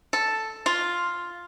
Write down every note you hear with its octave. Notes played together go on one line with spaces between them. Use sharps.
A4
F4